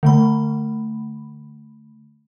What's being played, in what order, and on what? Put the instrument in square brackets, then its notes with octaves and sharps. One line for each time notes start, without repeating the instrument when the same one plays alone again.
[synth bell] D3 A3 B5